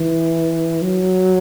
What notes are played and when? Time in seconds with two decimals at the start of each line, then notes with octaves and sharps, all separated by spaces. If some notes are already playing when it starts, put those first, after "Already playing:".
Already playing: E3
0.82 F#3